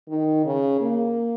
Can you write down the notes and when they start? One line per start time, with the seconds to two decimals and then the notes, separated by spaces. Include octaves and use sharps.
0.09 D#3
0.45 C#3
0.81 A#3